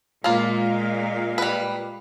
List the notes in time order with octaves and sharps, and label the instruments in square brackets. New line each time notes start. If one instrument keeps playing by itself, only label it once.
[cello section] A#2 G#3 F5 [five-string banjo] A#3 F4
[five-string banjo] G3 B4